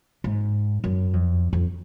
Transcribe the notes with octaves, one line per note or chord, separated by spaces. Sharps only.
G#2
F#2
F2
F2